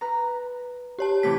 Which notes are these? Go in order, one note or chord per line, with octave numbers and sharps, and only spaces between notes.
B4 A#5
G4 C#5 A5
A2 C3 E3 B6